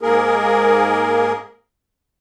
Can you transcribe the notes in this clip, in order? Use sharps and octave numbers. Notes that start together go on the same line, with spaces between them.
G#2 A#3 G#4 A#4